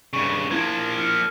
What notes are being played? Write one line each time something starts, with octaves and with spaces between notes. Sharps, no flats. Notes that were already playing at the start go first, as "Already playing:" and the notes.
G2 C#3 C#6
F3 A#3 E4 G#6
F6 C#7